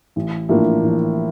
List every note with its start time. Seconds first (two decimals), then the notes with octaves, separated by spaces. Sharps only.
0.16 A1
0.49 A2 F3 A#3 D4
0.82 A1